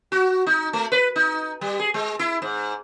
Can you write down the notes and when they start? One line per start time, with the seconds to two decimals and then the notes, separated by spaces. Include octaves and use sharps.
0.12 F#4
0.47 D#4
0.73 A3
0.92 B4
1.16 D#4
1.61 G3
1.80 G#4
1.94 G#3
2.19 E4
2.42 G#2